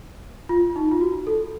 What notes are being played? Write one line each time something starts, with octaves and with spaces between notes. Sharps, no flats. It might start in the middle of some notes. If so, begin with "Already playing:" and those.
F4
D#4
F4
F#4
A4